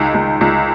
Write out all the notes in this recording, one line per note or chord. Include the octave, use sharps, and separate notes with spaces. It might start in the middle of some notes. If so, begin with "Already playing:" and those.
Already playing: C#2 D#3
C#2
C#2